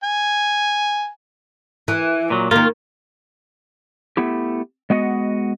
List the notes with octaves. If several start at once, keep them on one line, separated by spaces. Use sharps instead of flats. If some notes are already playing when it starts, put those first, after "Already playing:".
G#5
E3
A#2 F#3
D#3 A#3 F4
A3 B3 E4 G4
G#3 B3 F#4 D#5 F#5